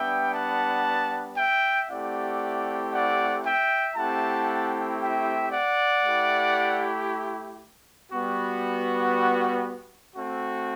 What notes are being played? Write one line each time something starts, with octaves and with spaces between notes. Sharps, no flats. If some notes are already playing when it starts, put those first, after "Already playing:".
Already playing: G3 B3 D4 E5 G5
F#5 A5
E5 G5
A3 C4 E4 G4 D5 F#5
D5 F#5
E5 G5
A3 C4 E4 G4 F#5 A5
E5 G5
D5 F#5
A3 E4 G4
G3 B3 F#4
A3 C4 F#4